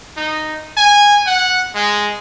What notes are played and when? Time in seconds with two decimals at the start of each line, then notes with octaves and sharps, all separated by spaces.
0.17 D#4
0.77 G#5
1.26 F#5
1.75 G#3